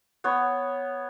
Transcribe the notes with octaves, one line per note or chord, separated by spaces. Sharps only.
B3 C#5